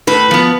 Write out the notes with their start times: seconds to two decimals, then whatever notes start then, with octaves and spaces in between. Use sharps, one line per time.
0.07 A2 B4
0.31 F3 B3